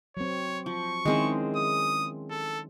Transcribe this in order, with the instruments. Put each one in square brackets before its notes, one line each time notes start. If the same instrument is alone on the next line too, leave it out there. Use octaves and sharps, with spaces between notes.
[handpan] F#3 C4 [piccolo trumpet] C#5
[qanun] F3 [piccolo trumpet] C#6
[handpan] D#3 E4 G#4 [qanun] G#3 C4 C#4
[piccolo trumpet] D#6
A4